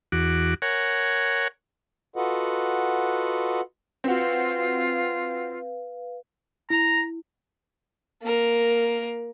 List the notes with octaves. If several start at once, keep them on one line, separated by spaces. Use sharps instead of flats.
E2 F#4 D6
A#4 C#5 F#5 G#5
F4 F#4 A4 B4 D#5 F#5
C4 F4 F#4 B4 F5
E4 A#5
A#3 A#4